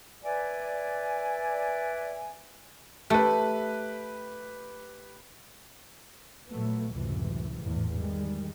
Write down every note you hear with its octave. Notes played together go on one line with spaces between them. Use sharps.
B4 D5 E5 G#5
A3 G4 B4
A#2 F#3 A3 B3
C#2 F#2 A2 C3 E3
G#1 E2 A2
D#3 G3 G#3